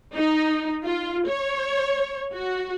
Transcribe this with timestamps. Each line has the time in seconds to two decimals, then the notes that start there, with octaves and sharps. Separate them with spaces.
0.15 D#4
0.85 F4
1.27 C#5
2.33 F#4